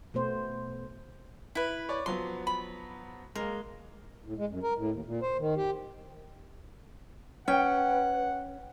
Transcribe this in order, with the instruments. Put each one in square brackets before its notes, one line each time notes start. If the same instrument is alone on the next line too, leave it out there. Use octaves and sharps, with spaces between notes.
[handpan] B2 A3 B3 C5
[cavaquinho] E4 B4
[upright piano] C#5 D5
[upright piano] F3 F#3 B3 [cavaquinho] C6
[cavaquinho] B5
[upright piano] G#3 A#3 [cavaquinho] A#4
[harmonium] A2
G#3
F#2
A#4
A2
D#2
A#2
C5
D#3
G4
[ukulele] C#4 [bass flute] B4 [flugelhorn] F#5 [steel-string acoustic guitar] G5